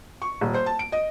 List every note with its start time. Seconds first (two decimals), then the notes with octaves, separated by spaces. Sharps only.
0.22 C#6
0.41 D#1
0.54 C5
0.66 A5
0.79 D7
0.92 D#5